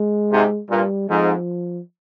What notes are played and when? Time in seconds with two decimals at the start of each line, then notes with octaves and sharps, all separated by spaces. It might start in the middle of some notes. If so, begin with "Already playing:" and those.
Already playing: G#3
0.31 G#2 C3
0.70 G2 A#2 G3
1.09 F2 G#2 F3